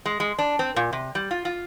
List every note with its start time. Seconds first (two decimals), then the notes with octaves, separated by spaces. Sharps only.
0.06 G#3
0.20 G#3
0.39 D4
0.59 C4
0.76 A#2
0.93 C3
1.15 G3
1.31 F4
1.45 F4